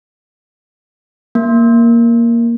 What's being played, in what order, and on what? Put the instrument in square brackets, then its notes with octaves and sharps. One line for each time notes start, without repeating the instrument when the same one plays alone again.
[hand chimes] A#3